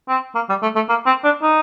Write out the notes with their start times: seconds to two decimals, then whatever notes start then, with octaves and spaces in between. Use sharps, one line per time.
0.08 C4
0.35 A#3
0.49 G3
0.62 A3
0.75 A3
0.89 A#3
1.06 C4
1.24 D4
1.42 D#4